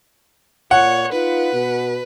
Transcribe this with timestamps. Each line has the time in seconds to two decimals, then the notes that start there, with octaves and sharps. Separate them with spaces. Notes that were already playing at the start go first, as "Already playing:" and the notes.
0.71 A#2 C#5 F#5
1.12 D#4 F4 B4
1.53 B2